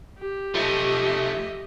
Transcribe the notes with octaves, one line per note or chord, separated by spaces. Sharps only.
G4
F3 A3 D#5 E5